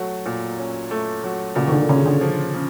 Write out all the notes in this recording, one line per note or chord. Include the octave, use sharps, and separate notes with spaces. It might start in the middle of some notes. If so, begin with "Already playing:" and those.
Already playing: F#3 A3
A#2
C#4
A3
F#3
A#2 C#3
D#3
D3
C#3 C#4
D3
F3
C#3